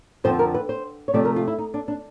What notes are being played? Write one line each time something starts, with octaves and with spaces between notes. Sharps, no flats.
F2 D3 F3 C4 C5
A#4
B4
C5
C#5
C3 F3 A3 D5
A#4
F4
E4
D#4
D4
D4